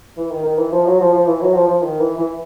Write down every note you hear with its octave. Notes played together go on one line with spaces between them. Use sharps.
E3
D#3
D#3
E3
F3
F#3
F3
F3
E3
F#3
F3
F3
D#3
E3
E3